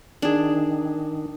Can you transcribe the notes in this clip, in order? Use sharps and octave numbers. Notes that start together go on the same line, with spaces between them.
D#3 D4 G#4